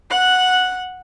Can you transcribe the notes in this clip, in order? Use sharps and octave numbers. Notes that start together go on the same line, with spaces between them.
F#5 F#6